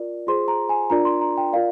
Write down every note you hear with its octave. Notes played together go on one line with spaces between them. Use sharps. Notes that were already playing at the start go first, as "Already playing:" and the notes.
Already playing: F4 A#4 D5
F4 G#4 C5 C6
A#5
G#5
D4 F4 A#4 D5 A#5
C6
A#5
G5
F4 A#4 D5 F5